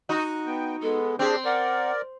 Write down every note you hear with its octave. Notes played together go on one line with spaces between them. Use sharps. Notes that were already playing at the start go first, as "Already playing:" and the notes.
D#4 F#4
B3 G5
G#3 B3 A4
C4 D4 G4 G#4 C5
A#4 D5 F#5